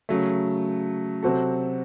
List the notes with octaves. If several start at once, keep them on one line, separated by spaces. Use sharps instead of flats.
C#3 F#3 A3
C3 F#3 C4 F#4 A4